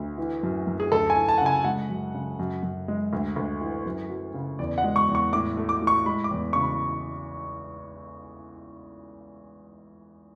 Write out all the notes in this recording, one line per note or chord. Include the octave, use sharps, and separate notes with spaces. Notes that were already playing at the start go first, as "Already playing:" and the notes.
Already playing: D2
E3
F#2
F#2
G#4
D2 A4
G#5
E3
A5
F#5
C#3 G#5
G#3 F#5
F#2
C#3
F#2
F#2
G#3
D2
D2
E3
F#2
F#3
C#3
E2 D5
F#5
G#3
C#6
E2
C#6
A2 D6
A3
D6
A2
C#6
G#3 B5
D6
E2
C#3 C#6
B5